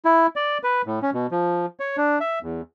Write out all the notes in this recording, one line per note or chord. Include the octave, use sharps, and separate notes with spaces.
E4
D5
B4
A2
C#4
B2
F3
C#5
D4
E5
E2